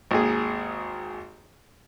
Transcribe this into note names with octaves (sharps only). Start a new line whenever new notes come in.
G#1 D#2 G#4